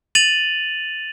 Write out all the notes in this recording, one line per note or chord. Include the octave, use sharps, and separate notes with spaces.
A6 D#7 F7 F#7